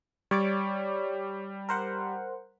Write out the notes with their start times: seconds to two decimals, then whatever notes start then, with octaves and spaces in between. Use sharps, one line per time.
0.31 G3 C#5 D5 D6
1.69 A#4 C5 F#5